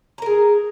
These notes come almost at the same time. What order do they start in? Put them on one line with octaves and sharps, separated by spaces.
A#5 A#4 G#4